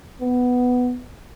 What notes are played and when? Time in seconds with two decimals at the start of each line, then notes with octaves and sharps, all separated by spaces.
0.21 B3